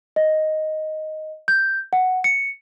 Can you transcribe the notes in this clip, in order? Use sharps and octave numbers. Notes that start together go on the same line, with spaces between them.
D#5
G6
F#5
C#7